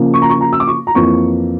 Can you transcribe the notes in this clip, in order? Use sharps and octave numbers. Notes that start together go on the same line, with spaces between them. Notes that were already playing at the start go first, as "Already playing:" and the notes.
Already playing: C#3 F3 A#3
C#6
A#5
C#6
A#5
E6
D6
C#6
A#5
F2 E3 A#3 C#6